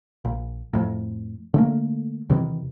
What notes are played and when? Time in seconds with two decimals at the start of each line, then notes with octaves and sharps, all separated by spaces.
0.25 A#1
0.73 F2 A2
1.54 D3 A3 A#3
2.30 E2 C3 D#3 E3